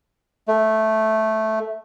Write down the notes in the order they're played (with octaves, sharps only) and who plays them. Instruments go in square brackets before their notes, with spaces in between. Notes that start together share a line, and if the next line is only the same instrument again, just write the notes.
[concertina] A3